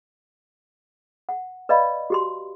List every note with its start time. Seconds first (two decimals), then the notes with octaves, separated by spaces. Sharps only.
1.29 F#5
1.69 B4 D5 D#5 F5 B5
2.10 F#4 G4 C6